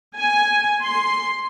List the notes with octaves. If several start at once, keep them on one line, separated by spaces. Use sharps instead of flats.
G#5
C6